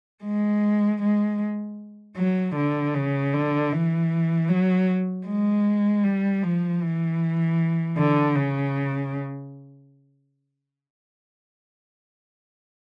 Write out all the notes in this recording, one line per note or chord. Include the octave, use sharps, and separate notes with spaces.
G#3
G#3
F#3
D3
C#3
D3
E3
F#3
G#3
G3
F3
E3
D3
C#3